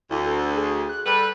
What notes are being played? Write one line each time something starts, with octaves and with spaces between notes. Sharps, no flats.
D2 E4
A4
G#4
F#6
G3 A4 B4